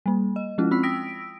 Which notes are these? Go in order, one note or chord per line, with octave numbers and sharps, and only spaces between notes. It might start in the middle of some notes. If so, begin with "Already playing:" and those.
G3 A#3
D#5
F3 G#3 C#4 E4 F4
C4 F4 B5 E6 B6
G5 D#6 E6 A#6 B6 D7